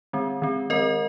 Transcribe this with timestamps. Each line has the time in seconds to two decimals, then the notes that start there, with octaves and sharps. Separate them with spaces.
0.13 D#3 G#3 C4
0.42 D#3 C4
0.70 D#3 G#3 C4 A#4 D#5